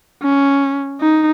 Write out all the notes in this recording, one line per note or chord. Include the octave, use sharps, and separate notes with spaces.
C#4
D#4